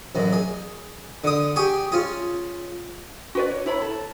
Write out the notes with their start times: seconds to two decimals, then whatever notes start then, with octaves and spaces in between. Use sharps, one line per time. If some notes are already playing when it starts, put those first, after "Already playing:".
0.15 A1 F#2
0.33 G#4
1.24 D3 D#6
1.56 G4 G#4 G#5 C#6
1.92 C#4 F4 G#4
3.35 F#4 B4 D5
3.52 C#5
3.66 E4 C#5 B5
3.82 A4